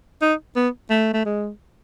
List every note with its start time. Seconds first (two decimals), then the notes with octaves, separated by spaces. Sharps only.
0.22 D#4
0.56 B3
0.90 A3
1.14 A3
1.25 G#3